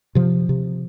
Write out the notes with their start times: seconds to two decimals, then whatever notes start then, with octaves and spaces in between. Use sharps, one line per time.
0.15 C3 F3
0.49 C3